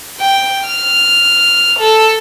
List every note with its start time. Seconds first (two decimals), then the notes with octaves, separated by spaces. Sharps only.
0.20 G5
0.66 F6
1.79 A4